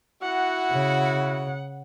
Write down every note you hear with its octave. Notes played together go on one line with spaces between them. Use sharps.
E4 F#4 F#5
C#3